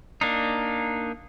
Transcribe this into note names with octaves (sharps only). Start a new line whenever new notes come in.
A#3 D4 D#4